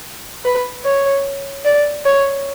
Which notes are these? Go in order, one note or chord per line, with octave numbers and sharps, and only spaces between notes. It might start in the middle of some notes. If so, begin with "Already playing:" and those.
B4
C#5
D5
C#5